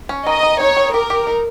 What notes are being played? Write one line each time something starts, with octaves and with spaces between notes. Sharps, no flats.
C#4
D#3 D#5
D#3
D#4 C#5
D#3
G4 A#4
G4
D#4